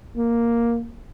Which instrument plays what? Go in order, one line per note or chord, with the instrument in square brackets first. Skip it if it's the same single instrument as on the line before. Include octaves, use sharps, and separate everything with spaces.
[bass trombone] A#3